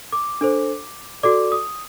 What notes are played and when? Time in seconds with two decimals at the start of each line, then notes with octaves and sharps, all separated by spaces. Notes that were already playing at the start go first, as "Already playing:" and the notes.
0.12 D6
0.41 D4 A4 C5
1.23 F#4 A4 D5 D6
1.52 D#6